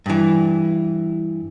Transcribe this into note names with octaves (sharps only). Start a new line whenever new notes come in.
G2 E3